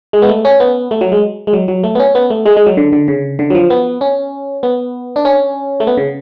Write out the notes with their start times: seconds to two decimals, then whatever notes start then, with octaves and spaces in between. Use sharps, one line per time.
0.13 G#3
0.22 B3
0.29 A3
0.45 C#4
0.60 B3
0.91 A3
1.01 F#3
1.12 G#3
1.47 G#3
1.53 F#3
1.68 F#3
1.84 A3
1.95 B3
1.99 C#4
2.15 B3
2.30 A3
2.46 G#3
2.57 G#3
2.66 F#3
2.77 D3
2.93 D3
3.08 C#3
3.39 D3
3.50 F#3
3.55 F3
3.70 B3
4.01 C#4
4.63 B3
5.16 D4
5.25 C#4
5.80 A3
5.87 B3
5.97 C#3